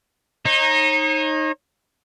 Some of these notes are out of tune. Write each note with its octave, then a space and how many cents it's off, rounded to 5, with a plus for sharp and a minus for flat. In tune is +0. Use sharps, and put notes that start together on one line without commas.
D#4 +0 C#5 -40